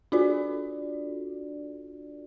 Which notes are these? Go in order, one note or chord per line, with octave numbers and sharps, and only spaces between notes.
D4 F4 F#4 A4 D5